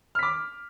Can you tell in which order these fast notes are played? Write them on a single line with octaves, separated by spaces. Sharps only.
F6 B6 D6